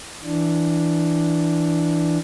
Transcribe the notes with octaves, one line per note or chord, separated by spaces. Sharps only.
E3 D4